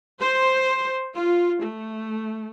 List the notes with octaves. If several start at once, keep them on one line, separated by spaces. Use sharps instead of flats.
C5
F4
A3